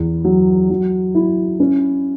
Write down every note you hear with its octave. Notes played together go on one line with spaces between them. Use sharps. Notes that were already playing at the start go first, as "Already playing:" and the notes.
Already playing: E2
F#3
F#3
E4
C#4